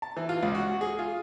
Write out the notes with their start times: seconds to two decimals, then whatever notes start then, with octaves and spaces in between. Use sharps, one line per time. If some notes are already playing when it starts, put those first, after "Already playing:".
0.02 A5
0.17 E3
0.29 F4
0.43 C#2
0.55 F#4
0.68 F#4
0.81 G#4
0.99 F4